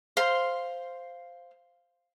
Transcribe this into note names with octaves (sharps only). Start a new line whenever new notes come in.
C5 F5 C6